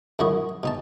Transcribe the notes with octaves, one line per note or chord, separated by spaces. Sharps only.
F#2 D#3 E4 F#4 D#5
B2 D#4 A5